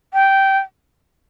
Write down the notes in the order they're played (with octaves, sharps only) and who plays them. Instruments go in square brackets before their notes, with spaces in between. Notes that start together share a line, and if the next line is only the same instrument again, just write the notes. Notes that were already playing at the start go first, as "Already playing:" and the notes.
[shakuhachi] G5